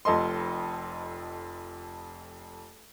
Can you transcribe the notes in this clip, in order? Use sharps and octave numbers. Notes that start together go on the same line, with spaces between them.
F1 F2 A4 D#5 C6